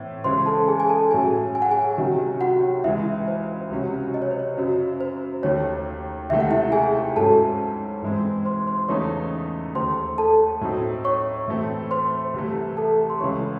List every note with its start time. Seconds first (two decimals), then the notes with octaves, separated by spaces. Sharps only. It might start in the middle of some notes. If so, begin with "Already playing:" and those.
Already playing: A2 E3 C4
0.24 C#2 C#3 E3 G#3 C5 C6
0.46 A4 A5
0.68 G#4 G#5
0.80 G#5
0.89 A4 A5
1.11 A2 F#3 C#4 G#4 G#5
1.55 G#5
1.62 F#5
1.71 G#4 G#5
1.98 C2 C3 D#3 F#3 C#4
2.41 F#4 F#5
2.84 C#2 C#3 E3 G#3 E4 E5
3.28 C5
3.71 C#2 C3 F#3 C#4 F#4
4.14 D#5
4.22 C#5
4.31 C5
4.39 C#5
4.57 F#2 C#3 F#3 C5
5.01 C5
5.43 D#2 D#3 A3 C#5
6.29 C#2 C3 D#3 A3 E5
6.40 F#5
6.51 E4 E5
6.72 G#4 G#5
7.16 G#2 F#3 C#4 E4 A4 A5
8.02 G#2 E3 G#3 C4
8.45 C5 C6
8.67 C5 C6
8.88 E2 C#3 E3 A3 D#4 C#5 C#6
9.75 D#2 D#3 A3 C5 C6
10.18 A4 A5
10.61 A2 F#3 C4 D#4
11.05 C#5 C#6
11.48 A2 E3 A3 C4
11.91 C5 C6
12.34 C2 C3 E3 A3
12.77 A4 A5
13.10 C6
13.20 C#2 C#3 E3 C#5 C#6